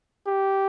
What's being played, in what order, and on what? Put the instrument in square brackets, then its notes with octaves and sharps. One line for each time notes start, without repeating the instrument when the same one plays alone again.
[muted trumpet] G4